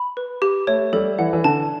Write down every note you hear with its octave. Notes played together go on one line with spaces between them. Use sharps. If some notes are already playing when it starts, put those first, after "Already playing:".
Already playing: B5
B4
G4
A3 C#5
G3 A4
E3 F#5
E3
D3 A5